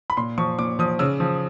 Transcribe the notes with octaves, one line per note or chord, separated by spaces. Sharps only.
B5
A#2 C6
F3 C#6
A#2 D6
F3 D#6
C#3 E6
F3